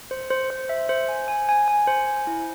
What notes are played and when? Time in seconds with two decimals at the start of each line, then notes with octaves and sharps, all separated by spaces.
0.11 C5
0.30 C5
0.50 C5
0.69 E5
0.89 C5
1.08 G#5
1.28 G#5
1.49 G#5
1.68 G#5
1.87 C5
2.07 G#5
2.27 E4